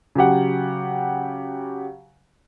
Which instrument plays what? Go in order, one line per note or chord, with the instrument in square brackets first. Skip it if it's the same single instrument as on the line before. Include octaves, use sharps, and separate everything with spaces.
[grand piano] C#3 F#3 G4 F#5